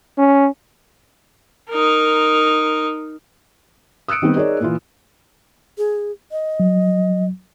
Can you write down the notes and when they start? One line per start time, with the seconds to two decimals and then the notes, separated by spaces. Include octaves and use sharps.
0.18 C#4
1.70 D#4 A#4
4.08 D#6 E6 F#6 C#7 D7
4.22 D#3 G3 B3 C4 G4
4.36 D#4 G#4 A#4 C#5 D5
4.60 A#2 E3 F4
5.78 G#4
6.32 D#5
6.60 F#3